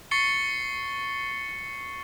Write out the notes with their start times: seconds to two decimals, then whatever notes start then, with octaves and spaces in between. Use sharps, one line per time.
0.11 C#6 A6 C7 C#7 G7